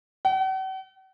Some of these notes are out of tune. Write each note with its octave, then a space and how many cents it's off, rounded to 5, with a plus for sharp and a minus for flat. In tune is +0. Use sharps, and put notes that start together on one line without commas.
F#5 +45